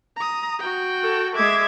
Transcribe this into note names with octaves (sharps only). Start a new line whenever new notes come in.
A#5 D#6
F#4 G5
A4
G#3 E5 D6 G#6